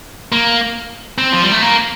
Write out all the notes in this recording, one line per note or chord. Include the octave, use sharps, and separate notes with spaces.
A#3
C4
F3
G3
A3
A#3